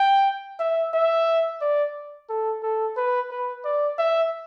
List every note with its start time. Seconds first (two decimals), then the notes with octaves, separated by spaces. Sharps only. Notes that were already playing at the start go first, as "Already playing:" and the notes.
Already playing: G5
0.59 E5
0.93 E5
1.61 D5
2.29 A4
2.63 A4
2.97 B4
3.31 B4
3.65 D5
3.98 E5